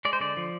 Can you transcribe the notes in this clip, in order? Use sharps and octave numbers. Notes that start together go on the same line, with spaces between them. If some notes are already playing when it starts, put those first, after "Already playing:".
G#3 D5
C5
D3 D5
F3